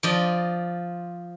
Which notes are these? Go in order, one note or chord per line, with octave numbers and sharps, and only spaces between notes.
F3 D5 D#5